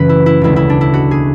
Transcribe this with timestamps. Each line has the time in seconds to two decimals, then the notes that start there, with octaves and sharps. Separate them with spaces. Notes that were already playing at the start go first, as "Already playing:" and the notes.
Already playing: F#2 C#3 E3 A3 B4 E5
0.09 E4
0.26 E4
0.41 E1 D2 C#3 G#3 E4
0.56 E4
0.70 D4
0.81 E4
0.94 F#4
1.11 G#4